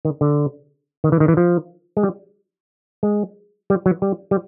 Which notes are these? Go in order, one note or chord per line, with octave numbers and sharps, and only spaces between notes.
D#3
D3
D#3
E3
D#3
E3
F3
G#3
G3
G#3
G3
F#3
G3
G3